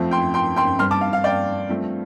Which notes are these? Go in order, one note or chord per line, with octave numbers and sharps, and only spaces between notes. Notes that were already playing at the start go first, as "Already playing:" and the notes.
Already playing: F2 F3 A3 C4
G5 C6
G5 C6
G5 C6
G2 G3 C4 C6 F6
A5 D6
F5
F5
D5 G5
G2 F3 A3 C4